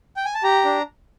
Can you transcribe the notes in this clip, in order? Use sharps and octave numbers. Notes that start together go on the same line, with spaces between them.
G5
G#5
A5
G4 A#5
D4